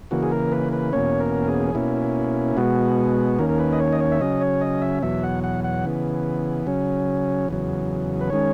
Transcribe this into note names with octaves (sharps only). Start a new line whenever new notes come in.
C#3 E3 A#3 F#4
G#4
A#4
B4
B4
E2 B2 A#3 C#4 C#5
A#4
G#4
B2 A#3 C#4 E4
B2 G#3 B3 F#4
D#2 D#3 A#3 C#4 A#4
A#4
B4
D#5
C#5
D#5
C#5
E5
C#3 F#3 C#4 D#5
C#5
D#5
E5
E2 B2 F#3 E5
F#5
F#5
F#5
C#3 E3 B3
C#3 F#3 C#4
E2 C#3 F#3
B4
D#3 G#3 C#4 C#5